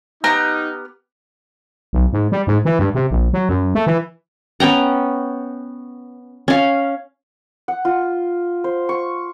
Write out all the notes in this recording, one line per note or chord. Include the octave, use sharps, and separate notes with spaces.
B3 D#4 G4 A#5 F6
B1
G#2
G3
G#2
E3
G2
C3
A#1
F#3
F#2
A3
E3
B3 C#4 G5 A#5
C#4 F5
F#5
F4
C5
C#6